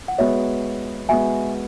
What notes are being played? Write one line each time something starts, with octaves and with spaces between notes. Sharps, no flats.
F#5
G#3 B3 F#4 C#5 E5
G#3 B3 F#4 E5 G#5